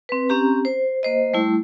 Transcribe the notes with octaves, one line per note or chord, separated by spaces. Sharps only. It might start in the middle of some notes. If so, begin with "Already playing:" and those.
C4 B4
C4 C#4 G4 A#5
C5
A#3 C5 D#5
G3 A3 E4